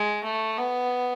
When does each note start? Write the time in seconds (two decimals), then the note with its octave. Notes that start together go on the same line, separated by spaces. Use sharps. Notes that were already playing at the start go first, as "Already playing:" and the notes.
Already playing: G#3
0.24 A3
0.57 B3